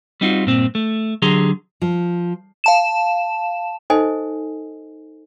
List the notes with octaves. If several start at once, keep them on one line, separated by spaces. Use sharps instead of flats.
G3 C4 D#4 F4 F#4
G2 A#2 C4
A3
D3 F#3 G4 G#4 A#5 C6
F3
F5 A5 E7
D#4 A4 C5 D#5 G#5